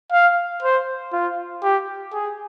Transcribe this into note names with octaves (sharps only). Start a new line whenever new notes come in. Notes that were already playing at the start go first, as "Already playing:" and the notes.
F5
C5
F4
G4
G#4